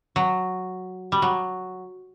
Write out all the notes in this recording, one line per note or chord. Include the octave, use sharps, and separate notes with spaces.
F#3
G3
F#3